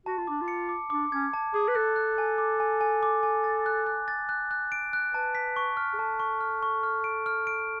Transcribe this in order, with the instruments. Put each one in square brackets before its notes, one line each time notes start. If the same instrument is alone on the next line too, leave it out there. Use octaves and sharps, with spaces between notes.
[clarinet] F#4 [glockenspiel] A5
[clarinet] F4
[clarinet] D4 [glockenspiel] D6
[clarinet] F4
[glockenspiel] C#7
D6
[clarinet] D4 [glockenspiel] D6
[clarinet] C#4 [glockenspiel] G#6
[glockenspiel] A5
[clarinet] G#4 [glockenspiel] D6
[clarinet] B4
[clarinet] A4 [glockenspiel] F#6
[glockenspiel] F#6
G#5
D6
G#5
G#5
D6
G#5
A6
F#6
F#6
A6
F#6
F#6
D7
F#6
[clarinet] B4 [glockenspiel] A5
[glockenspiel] B6
C#6
F6
[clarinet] G#4
[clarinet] A4 [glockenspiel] A5
[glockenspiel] C#6
F6
C#6
F6
D7
F6
D7